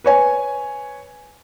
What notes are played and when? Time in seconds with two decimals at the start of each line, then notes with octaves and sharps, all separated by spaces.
0.04 B4 C#5 G#5